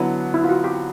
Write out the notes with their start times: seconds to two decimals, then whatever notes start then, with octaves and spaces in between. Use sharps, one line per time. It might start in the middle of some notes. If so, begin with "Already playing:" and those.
Already playing: D3 F#3 B3 E4
0.34 E4
0.44 F4
0.49 F#4
0.64 G4